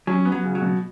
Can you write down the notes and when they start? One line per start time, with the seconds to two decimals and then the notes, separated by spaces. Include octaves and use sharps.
0.07 F#3 C#4
0.25 B3
0.32 F#3
0.44 C#3
0.55 F#3
0.62 B2